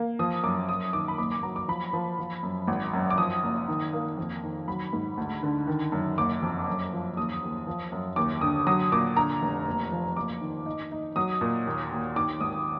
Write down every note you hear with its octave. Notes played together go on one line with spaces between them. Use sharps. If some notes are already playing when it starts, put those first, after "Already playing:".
Already playing: A#3
F3 D#6
F#2 D6
F#2 D#6
D#3 D6
B5
F#1 D6
D6
F#3 A#5
D6
F3 B5
F3
F3
F#2
G#1
F#2
D6
F3 D#6
F#1
D#3
A#3
F2
D#3
F#3 B5
G#2
D2
D3
D#3
F#2
F#1 D6
F2
F#2
F3
D#2 D#6
D#2
F3
F#2
D#2 D6
D3 D#6
F#3 D#6
A#2 D6
D3 A#5
F1
F#1
F3
F#1 D6
D#3
D#4
D#4
F#3 D#6
A#2
D#2
D#2
D#3 D6
G#1 D#6